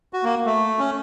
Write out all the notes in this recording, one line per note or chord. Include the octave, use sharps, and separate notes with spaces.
F#4
A#3
A3
C#4